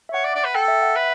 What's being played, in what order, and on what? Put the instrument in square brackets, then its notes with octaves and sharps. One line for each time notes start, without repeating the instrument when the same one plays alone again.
[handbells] E5
[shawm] C#5 [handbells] F#5
[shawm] D5
D5
B4
[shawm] A4 [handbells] G5
[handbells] E5
F#5
[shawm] B4 [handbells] E5